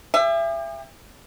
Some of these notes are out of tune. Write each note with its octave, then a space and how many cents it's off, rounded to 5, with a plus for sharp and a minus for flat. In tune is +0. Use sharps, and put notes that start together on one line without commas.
G4 +45 E5 +25